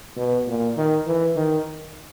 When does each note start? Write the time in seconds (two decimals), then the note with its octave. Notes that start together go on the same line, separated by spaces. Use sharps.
0.17 B2
0.47 A#2
0.77 D#3
1.06 E3
1.36 D#3